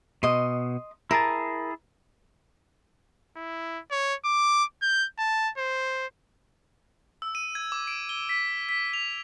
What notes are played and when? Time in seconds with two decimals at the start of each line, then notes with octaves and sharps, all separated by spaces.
0.23 B2 D#5 C6
1.11 E4 G#4 A#4 A5
3.37 E4
3.91 C#5
4.25 D6
4.82 G6
5.18 A5
5.57 C5
7.22 E6
7.35 D#7
7.55 G#6
7.72 D6
7.87 D7
8.09 G7
8.29 B6
8.69 B6
8.93 F7